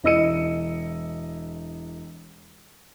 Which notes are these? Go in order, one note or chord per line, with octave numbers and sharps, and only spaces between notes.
E1 E4 D#5 E6 C#7 D#7